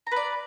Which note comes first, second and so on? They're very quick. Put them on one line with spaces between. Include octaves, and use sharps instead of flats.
A#5 B4 D5